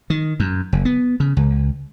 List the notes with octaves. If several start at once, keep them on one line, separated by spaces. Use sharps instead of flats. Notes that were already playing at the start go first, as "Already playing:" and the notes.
D#3
F#2
F#1
B3
C#3
C#2